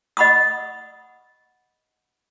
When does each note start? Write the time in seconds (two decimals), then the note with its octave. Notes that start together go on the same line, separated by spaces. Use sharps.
0.17 D#5 F#5 B5 C#6 D#6